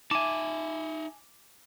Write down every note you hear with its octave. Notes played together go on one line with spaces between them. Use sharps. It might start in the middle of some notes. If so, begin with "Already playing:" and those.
D#4 E5 G#5 A5 D6